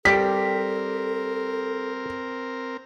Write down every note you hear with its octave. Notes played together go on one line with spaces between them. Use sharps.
G3 C4 G4 A4 A#4 B6